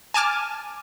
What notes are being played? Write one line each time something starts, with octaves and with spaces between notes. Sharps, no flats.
G#5 A5 D6 F6